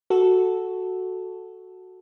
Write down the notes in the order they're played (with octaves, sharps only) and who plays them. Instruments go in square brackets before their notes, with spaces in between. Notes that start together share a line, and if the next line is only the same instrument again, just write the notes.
[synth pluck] F#4 A4